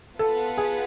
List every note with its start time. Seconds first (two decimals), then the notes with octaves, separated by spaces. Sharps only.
0.19 B3 F4 A4 B4 F#5 A5
0.57 G#4